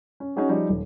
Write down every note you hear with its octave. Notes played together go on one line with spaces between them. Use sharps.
C#4
C#4 D#4 F#4 G#4 C#5
F3 G3 D#4
D#1